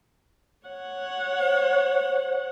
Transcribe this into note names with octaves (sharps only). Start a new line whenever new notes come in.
C#5 F#5
C5